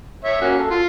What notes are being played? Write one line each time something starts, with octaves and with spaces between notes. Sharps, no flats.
C#5 E5
A#3 C#4 F#4
A4
F4